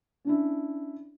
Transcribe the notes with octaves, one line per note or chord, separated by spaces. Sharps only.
C#4 D4 E4